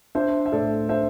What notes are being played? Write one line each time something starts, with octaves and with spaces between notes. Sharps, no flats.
D4 C5 E5
E5
A2 A4 D5
D4 C5 E5